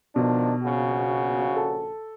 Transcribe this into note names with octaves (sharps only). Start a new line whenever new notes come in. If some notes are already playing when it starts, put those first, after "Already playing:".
B2 D#3 F3 D4
A#1 C#3 F#4
A4